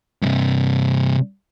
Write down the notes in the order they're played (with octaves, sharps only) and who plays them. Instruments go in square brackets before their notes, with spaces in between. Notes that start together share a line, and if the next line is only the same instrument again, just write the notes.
[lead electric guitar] G2 C3